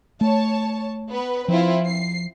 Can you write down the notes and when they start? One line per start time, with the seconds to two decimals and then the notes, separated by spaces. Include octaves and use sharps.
0.21 A3 C#5 A5
1.10 B3 B4
1.48 F3 C4 E4 F4
1.86 C7